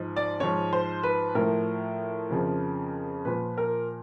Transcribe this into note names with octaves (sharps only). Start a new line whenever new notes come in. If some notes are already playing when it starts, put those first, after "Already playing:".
Already playing: G#2 F3
D5
G#2 F3 C#5
C5
B4
A2 F3 A#4
F2 C#3 F3
A#2 F3 B4
A#4